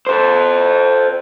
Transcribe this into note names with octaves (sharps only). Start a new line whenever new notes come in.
A4 C5